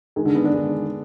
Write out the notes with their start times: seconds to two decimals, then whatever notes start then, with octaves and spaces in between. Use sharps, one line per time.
0.16 D#3 G#3 D#4 G#4
0.25 D3
0.35 B3
0.45 D4
0.54 D#3 G#3